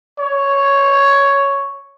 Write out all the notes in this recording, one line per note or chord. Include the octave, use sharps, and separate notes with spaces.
C#5